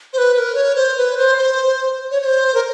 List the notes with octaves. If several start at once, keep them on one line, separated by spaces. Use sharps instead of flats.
C5
B4
B4
A#4
C#5
C5
B4
C5
C5
C#5
C#5
C5
A#4